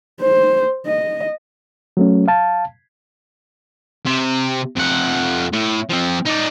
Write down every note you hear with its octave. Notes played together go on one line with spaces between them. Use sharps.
C5
D#5
F#3 A3 C#4
F5 A5
C3
F2 F#5
A2
F3 C4
D#4 D5